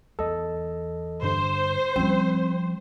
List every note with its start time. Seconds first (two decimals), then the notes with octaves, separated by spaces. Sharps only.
0.19 E2 A4 D#5
1.22 G2 D3 D4 C5
1.96 F3 G3 C4 C#4